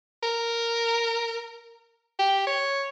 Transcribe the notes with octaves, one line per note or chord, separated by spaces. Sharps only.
A#4
G4
C#5